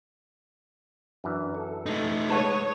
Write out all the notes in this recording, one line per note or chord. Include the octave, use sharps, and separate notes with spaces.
F#2 E3 D4
A4
A3 D#4
G#3 B4 C#5 F#5 A5 D#6